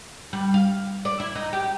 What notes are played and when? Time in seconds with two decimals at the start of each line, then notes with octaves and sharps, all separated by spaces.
0.33 G3
0.54 F5
1.05 D5
1.20 E4
1.35 D#4
1.53 G4